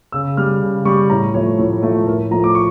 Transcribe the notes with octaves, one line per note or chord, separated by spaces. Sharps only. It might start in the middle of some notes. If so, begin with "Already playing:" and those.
C#3 E6
G3 F6
C#3
G3 C#6
A2 A#5
F3 A3 C#5
A2
F3 A3
A2 A#4
F3 A3 A#5
D6
C#6